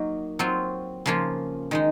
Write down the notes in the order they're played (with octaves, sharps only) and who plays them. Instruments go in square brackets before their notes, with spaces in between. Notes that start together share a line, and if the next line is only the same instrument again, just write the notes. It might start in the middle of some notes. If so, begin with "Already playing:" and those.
Already playing: [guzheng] F#3 A#3 D#4 A#4
F#3 C4 F4
C#3 F3 A#3 F4
D#3 G#3 D#4